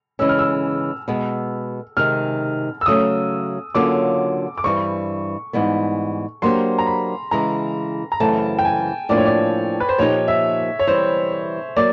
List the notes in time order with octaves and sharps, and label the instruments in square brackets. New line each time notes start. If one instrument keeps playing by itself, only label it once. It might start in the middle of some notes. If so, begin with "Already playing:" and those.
[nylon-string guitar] C#3 E3 G#3 C#4 [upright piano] E6
[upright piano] F6
E6
[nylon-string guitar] B2 G#3 B3
[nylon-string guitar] C3 D#3 G#3 [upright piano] F6
[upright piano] E6
[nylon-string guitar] C#3 F#3 A3 C#4 [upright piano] D#6
[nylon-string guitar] D3 F#3 A#3 C#4 F4 [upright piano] D6
[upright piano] D6
[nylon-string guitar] G2 E3 G3 C4 [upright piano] C#6
[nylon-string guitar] G#2 E3 G3 B3
[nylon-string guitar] F#3 A#3 D4 G4 C5 [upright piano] C6
[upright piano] A#5
B5
[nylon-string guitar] C#3 E3 G#3 [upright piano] A#5
[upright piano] A#5
[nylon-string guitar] F#2 C#3 E3 A3 C4 [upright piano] A5
[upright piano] G5
G#5
[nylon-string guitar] A2 F3 A#3 D4 F4 [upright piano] D5
[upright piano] C#5
D5
B4
C5
[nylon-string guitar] A#2 F3 A#3 D#4 G4 [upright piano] C#5
[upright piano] E5
C#5
[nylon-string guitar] E3 G3 C4 [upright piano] C5
[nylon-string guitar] F#3 A#3 [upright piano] D5